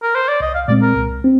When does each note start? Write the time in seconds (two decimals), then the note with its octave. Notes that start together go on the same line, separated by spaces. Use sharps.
0.02 A#4
0.15 C5
0.28 D5
0.40 C2 D#5
0.54 F5
0.68 A#2 G#3 C4 D5
0.82 A#4
0.96 C2
1.24 C4